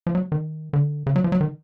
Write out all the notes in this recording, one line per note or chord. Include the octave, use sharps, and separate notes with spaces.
F3
F#3
D#3
D3
C#3
F#3
F3
F#3
D#3